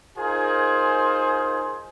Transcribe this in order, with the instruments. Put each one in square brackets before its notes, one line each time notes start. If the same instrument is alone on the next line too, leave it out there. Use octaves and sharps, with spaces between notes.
[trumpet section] D#4 F4 G#4 A#4 C5 G#5